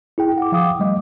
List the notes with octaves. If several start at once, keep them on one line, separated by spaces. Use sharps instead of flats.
E4 G#4 G5
F#5 D6
F3 F5 G5 D6 D#6
G3 A3 D#5